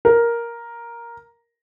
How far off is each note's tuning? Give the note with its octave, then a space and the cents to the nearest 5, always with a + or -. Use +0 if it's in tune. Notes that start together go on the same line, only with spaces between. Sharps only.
A#4 +5